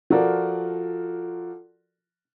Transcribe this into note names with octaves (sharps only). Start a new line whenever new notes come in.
F3 F4 F#4 A4 A#4 D5